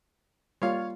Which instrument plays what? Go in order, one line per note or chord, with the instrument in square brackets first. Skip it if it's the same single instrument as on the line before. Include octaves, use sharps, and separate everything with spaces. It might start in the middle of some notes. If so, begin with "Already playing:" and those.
[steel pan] G3 A#3 F4 [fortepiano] C#5 F5